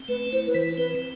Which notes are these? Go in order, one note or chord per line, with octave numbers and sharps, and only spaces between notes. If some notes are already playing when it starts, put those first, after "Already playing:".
Already playing: C4
A3 B4
E4 C5
B4
E3 C5
C4 B4